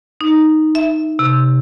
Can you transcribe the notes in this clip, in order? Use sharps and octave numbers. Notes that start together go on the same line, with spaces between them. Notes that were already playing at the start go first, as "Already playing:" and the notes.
D#4
E5
C3